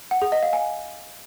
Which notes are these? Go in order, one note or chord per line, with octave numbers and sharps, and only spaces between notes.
F#5
G#4
D#5
F5
G#5